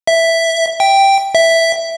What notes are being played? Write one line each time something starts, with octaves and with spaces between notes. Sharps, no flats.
E5
G5
E5